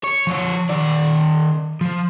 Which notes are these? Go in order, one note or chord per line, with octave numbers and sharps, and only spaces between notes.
C#5
F3 C#5
D#3 D5
F3